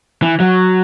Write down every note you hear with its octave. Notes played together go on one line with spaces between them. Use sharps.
E3
F#3